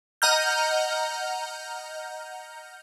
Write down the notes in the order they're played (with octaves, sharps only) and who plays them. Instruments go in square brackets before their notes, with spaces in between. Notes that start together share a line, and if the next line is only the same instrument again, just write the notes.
[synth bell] D#5 F#5 A#5 F6 G6